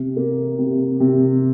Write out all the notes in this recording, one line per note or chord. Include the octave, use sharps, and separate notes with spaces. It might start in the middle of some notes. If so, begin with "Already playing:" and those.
Already playing: C3
A#3
C3
C3